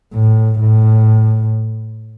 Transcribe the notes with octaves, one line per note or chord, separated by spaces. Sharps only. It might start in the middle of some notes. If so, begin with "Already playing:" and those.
A2
A2